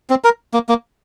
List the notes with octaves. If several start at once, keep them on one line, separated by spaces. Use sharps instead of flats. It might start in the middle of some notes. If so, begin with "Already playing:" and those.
C4
A#4
A#3
A#3